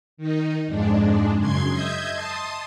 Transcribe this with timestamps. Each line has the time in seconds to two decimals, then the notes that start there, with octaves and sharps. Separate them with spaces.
0.17 D#3 D#4
0.67 F2 G#2 G#3 D4
1.37 F#2 C#3 C6 G#6
1.71 D#5 E5 G6 G#6
2.11 A5 C6 D#6